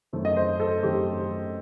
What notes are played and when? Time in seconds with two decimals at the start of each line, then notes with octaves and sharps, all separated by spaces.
0.13 F#2 D#3 A3 C4
0.25 D#5
0.36 C5
0.60 A4
0.83 F#2 D#3 A3 C4 G4